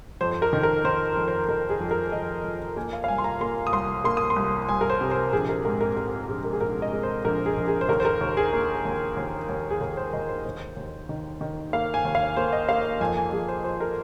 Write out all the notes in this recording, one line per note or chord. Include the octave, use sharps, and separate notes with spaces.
F2 C5
C5
A#4
D#3
A#4
D#3 C5
F2
C5
D#3 A#4
G#4
F2
A#4
F2 D#5
F2
A#3 G#5
F5
F5
C2 G#5
C6
A#5
A#3 C6
D#6
C2 C6
A#3 C6
D#6
C6
C2
C2 G#5
A#4
C5
C3
C5
A#1 G#4
A#4
G#2 A#4
A#4
G#3 A#4
A#1 G#4
A#4
G#4
A#1 A#4
D#5
G#3
C5
A#1 A#4
G#4
A#1
G#4
C5
D#2 A#4
C5
A#4
D#2
G#4
A#3
D#2
D#2
D#2
G#4
D#2 A#4
C5
D#2 D#5
C5
D#2 C5
D#2
D#3
D#3
A#3 F5
G#5
D#2
F5
A#3 C5
D#5
A#3 F5
F2 G#5
G#5
F2 G#4
C5
F3 C5
A#4